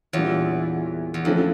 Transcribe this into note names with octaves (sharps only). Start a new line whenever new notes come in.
E2 A#2 G3 D4 F4 C#5
E2
F2 D3 F3 A3 C#4